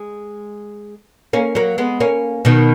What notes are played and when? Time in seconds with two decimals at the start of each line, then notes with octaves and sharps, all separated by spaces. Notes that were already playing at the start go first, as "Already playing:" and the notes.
Already playing: G#3
1.33 A#3 C#4
1.55 F#3 A#3
1.78 G#3 B3
2.00 A#3 C#4
2.45 B2 D#3